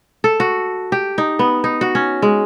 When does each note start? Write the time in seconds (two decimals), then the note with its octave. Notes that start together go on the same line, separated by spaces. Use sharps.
0.24 A4
0.40 F#4
0.92 G4
1.18 D#4
1.39 B3
1.64 D#4
1.81 F#4
1.95 C#4
2.22 G#3